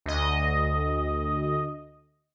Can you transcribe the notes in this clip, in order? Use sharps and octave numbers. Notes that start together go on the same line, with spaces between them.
D2 D#5